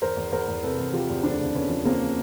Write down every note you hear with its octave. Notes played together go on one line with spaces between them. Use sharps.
E2 A#4 C5
E2
E2 A#4 C5
E2
C3 A4 B4
E2
F3 F4 G4
E2
D2 C4 D4
C#3
D2 B3 C#4
F3
C#3 A#3 C4